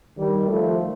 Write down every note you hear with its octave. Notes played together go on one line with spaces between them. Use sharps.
D#3 G3
F3 A3